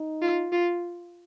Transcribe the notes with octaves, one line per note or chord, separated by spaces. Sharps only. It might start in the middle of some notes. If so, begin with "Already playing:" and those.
Already playing: D#4
F4
F4